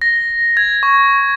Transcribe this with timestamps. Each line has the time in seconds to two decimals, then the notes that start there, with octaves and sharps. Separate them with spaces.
0.02 A#6
0.57 G#6
0.83 C#6